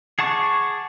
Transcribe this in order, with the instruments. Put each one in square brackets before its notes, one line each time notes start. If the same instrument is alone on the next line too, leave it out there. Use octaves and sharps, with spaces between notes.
[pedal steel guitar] G#4 F#5 A5 C#6 D6